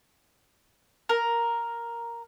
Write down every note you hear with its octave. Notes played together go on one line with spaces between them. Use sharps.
A#4